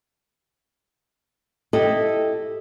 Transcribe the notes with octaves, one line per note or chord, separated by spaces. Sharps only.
E4 G4 A4 D#5